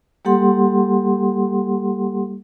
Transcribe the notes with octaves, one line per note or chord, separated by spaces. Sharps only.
G3 A#3 G4 A4 F#5 C6